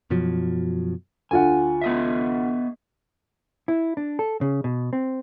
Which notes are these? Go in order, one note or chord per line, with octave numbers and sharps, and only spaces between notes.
F#2 B2 F3 F#3
D2 F4 F#5 G#5
B3 D#5 E5
E4
D4
A4
C#3
B2
C4